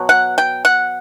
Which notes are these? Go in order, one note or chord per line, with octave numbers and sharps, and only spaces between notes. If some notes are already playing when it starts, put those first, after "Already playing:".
Already playing: B2 F#3
F#5
G5
F#5